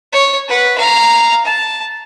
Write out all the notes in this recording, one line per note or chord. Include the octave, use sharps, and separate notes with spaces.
C#5
B4 F#5
F5 A#5
A5